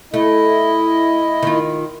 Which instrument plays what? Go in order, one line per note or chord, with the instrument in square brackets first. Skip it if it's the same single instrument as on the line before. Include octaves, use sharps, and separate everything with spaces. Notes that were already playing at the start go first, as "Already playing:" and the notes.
[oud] A3 [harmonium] E4 D#5
[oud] D#3 F4